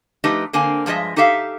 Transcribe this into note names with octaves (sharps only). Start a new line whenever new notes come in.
F3 A3 D#4 G4 B4 D#5
D3 A#3 C4 G#5
G2 F3 G#3 D#5 E5
D#4 G4 A4 E5 F5